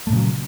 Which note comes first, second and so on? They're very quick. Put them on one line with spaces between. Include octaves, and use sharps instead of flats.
A3 A#2 C#3 F#3